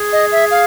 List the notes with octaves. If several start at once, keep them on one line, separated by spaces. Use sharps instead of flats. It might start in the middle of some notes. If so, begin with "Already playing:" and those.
Already playing: G#4
D#5
E5
F5